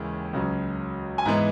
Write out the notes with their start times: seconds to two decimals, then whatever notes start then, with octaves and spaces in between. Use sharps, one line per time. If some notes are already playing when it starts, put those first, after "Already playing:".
Already playing: D#2 C#3 E3 G#3
0.33 C#2 C#3 F#3
1.18 G#5
1.25 G#2 E3 G#3 B3 A#5